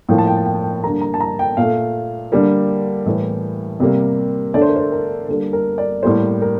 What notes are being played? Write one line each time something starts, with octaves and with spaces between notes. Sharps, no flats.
A2 F3 A#3 G5
A5
G5
A5
G5
A5
G5
D3 G3 A#3 A#5
A#5
A5
A#5
G5
A#2 A3 F5
D3 G3 A#3
A2 E3 G3 A#3 E5
C3 G3 A#3
D3 A3 D5
C5
A#4
C5
A#4
D3 G3 A#3 A4
A#4
D5
A2 G3 A#3 C5
A#4